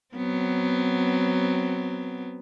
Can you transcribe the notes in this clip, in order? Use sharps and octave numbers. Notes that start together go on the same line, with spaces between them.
F#3 B3 C4